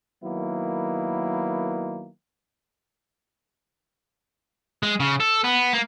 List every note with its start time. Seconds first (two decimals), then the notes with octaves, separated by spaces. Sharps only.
0.23 D#3 F#3 A#3 B3 E4
4.83 G#3
5.00 C#3
5.20 A4
5.44 B3
5.73 A#3